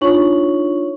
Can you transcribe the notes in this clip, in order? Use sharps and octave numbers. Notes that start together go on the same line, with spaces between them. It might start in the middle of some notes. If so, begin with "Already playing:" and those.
D4 D#4 F4 C#5 C#6 F#7